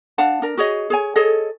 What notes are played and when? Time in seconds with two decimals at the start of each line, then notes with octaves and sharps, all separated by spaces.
0.18 D4 F5 F#5 A5
0.42 D4 A#4
0.57 F#4 G#4 C#5 D#5
0.90 G#4 C#5 G#5
1.16 G#4 A4 C#5 D#5